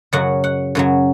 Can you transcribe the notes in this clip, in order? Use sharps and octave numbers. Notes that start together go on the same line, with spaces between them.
F#2 C#3 F#3 F#5
F#5
F#2 C#3 F#3